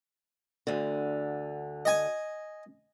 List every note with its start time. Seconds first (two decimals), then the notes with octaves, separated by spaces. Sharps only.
0.67 D2 D3
1.85 D#5 G#5